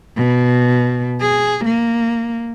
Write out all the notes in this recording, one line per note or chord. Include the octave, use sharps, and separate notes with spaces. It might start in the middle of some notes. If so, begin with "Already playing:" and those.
B2
G#4
A#3